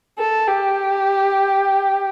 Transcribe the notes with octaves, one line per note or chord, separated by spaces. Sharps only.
A4
G4